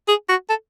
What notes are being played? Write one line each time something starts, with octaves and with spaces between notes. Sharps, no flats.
G#4
F#4
A4